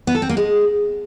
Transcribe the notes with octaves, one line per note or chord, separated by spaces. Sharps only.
B3
A4
C4
A#3
G#3